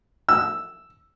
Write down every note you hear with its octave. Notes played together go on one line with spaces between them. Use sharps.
E6